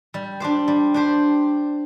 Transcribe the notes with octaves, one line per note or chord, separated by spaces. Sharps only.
G3
D4 G4 C5
G3
D4 G4 C5